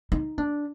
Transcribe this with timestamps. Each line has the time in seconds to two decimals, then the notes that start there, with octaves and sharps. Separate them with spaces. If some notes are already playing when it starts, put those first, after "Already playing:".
0.12 D#4
0.38 D4